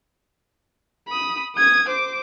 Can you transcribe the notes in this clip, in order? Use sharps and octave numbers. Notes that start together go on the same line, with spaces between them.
B5 D#6
D#6 G#6
C5 D6